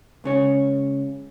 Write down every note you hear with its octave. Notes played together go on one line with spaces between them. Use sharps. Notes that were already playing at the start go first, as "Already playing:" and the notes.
C#2 C#3 C#5